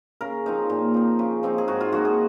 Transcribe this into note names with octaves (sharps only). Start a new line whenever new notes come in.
C#3 A#4
F3 C4 D#4
A#2
F3 C4
C#3
F3 C4 D#4
G#4
G#2 F#4
F4
F3 A#3 D#4 F#4
G#4